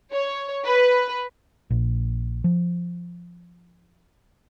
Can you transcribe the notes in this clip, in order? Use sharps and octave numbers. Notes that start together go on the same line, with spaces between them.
C#5
B4
A#1
F3